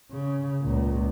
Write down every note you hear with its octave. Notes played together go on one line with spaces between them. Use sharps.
C#3
C#2 A#2